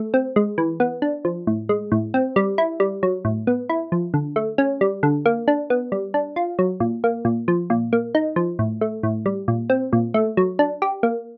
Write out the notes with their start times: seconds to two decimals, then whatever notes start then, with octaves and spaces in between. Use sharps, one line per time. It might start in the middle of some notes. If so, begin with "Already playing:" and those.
Already playing: A3
0.14 C4
0.36 G#3
0.58 E3
0.80 B3
1.02 D4
1.25 F3
1.47 A2
1.69 G#3
1.92 A2
2.14 C4
2.36 G3
2.58 E4
2.80 G3
3.03 F#3
3.25 A2
3.47 B3
3.69 E4
3.92 F3
4.14 D3
4.36 A3
4.58 C#4
4.81 G3
5.03 D3
5.26 A#3
5.48 D4
5.70 B3
5.92 G3
6.14 D4
6.36 F4
6.59 F#3
6.80 A#2
7.04 A#3
7.25 A#2
7.48 F3
7.70 A#2
7.93 A#3
8.15 D#4
8.36 F3
8.59 A2
8.81 A3
9.03 A2
9.26 G3
9.48 A#2
9.70 C4
9.93 A#2
10.14 A3
10.37 F#3
10.59 D4
10.82 G4
11.03 A#3